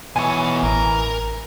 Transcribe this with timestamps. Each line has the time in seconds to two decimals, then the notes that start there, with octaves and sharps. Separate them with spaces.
0.16 B2 E3 C#5 G#5
0.63 A1 A#4